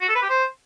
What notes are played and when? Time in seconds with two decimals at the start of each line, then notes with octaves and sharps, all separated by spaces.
0.01 F#4
0.08 A4
0.15 B4
0.22 G4
0.29 C5